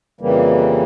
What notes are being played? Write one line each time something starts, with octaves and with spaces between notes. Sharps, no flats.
F2 C#3 E3 G3 A#3